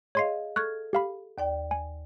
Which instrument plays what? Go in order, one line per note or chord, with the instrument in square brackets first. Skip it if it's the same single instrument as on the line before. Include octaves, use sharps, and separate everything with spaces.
[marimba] G#4 D#5 F5 [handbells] C#5 C6 C7
[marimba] A4 F6 G#6 [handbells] C#6 F#6
[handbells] G4 F5 B5
[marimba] D#2 D5 G5
[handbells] G#5